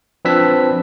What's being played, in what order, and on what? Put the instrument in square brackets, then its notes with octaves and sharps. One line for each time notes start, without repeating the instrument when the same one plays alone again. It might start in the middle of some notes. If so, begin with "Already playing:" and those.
[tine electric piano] F3 C4 D4 B4 E6 B6